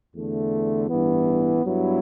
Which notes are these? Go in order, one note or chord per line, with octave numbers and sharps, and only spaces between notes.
E2 D3 A3
A1 G2 E3 B3
G2 F#3 B3 E4